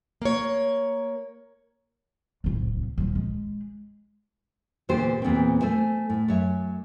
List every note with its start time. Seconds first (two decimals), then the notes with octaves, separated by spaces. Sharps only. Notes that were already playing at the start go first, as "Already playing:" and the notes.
0.22 A#3 C#5
2.44 D1 C2
2.98 D#1 F3
3.15 G#3
4.89 E2 A#2 D3 G4 C5
5.22 E2 A#2 A#3 C4
5.62 A3 C5 G#5
6.10 A2
6.28 F#2 C#5 E5